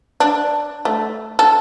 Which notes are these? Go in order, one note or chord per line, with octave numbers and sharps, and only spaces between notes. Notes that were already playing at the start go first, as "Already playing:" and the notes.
D4
A3
A4